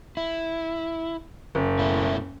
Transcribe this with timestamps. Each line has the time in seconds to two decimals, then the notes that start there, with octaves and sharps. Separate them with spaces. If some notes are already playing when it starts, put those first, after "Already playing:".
0.17 E4
1.55 F#1
1.79 B2 A3 E4